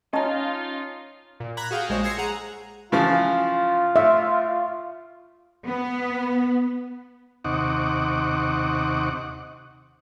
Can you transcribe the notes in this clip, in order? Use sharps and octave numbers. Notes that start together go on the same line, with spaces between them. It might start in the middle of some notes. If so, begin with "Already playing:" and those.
C#4 D#4 F4 D#5 A5 A#5
A#2
A#5 B5 F#6 G#6
F#4 G#4 F5 G5
A#1 G#3 C5 C#5
G#5 E6 G#6 A#6 C7 C#7
G#4 F#5 A#5
C#3 E3 F3 F4
A2 E5
B3
D#2 C3 D#4 F#5 C#6 D6